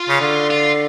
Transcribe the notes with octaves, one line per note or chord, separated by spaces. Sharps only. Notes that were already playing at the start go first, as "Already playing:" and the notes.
Already playing: F4
C#3
D3
F4